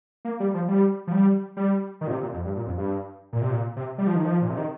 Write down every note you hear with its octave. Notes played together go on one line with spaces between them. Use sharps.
A#3
G3
F3
G3
F3
G3
G3
D#3
A#2
C3
A#2
F2
G2
A#2
F2
G2
A#2
C3
A#2
C3
G3
F3
D#3
F3
A#2
C3
D#3